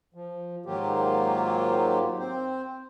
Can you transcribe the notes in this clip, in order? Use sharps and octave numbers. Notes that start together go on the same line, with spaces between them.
F3
G#2 D#3 F#3 A#3 F4 G4
C4 C5